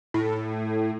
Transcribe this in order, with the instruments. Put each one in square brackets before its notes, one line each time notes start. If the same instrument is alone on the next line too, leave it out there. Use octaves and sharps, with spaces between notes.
[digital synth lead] A2